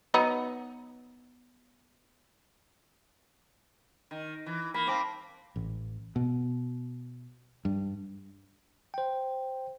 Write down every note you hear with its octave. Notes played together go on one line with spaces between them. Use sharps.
F#3 B3 D#4
D#3
E3
A#3 B5
C4 F5 A5 D6
A1
B2
G2
C5 G5